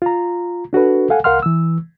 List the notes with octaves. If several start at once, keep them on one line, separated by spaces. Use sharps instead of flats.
F4 A#5
D4 F#4 A4 B4
A4 F5 F#5 G#5
C2 A#4 F5 F#5 C6 F6
E3 E6